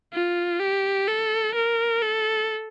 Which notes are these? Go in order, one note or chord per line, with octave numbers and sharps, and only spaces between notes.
F4
G4
A4
A#4
A4